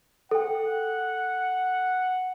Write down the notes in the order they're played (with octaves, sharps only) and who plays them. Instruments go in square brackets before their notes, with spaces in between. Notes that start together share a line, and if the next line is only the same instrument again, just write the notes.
[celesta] A4 G5 [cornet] F#5